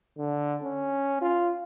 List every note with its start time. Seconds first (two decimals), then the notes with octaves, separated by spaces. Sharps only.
0.18 D3
0.64 C#4
1.22 F4